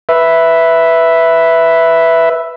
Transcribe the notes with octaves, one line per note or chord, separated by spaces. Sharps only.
B4 E5